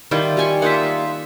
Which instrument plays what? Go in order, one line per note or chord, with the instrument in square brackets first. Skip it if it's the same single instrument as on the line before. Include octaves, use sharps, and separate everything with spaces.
[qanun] D#3 G5 [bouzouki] G3 [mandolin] E4 F4 D5
[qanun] G4 G#5 C#6
[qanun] A#3 F#5 [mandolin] D#4 F4 E5